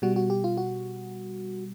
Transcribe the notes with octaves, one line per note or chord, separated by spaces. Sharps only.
B2 G3 F#4
F#4
G4
F4
F#4